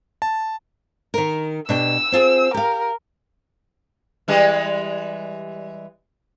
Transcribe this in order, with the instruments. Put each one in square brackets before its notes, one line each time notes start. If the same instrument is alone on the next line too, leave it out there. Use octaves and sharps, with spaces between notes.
[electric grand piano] A5
[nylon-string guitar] D#3 A#4
[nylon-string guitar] B2 D4 G4 [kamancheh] E6
[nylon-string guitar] C4 F4 G#4
[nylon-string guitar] G4 F5 [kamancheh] A#4
[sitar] E3 G3 G#3